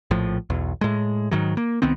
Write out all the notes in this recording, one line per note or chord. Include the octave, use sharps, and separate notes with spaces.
A#1 A2 F3
B1 E2
A2 G#3
G#2 D#3 F#3
A#3
C2 D#3 B3 C4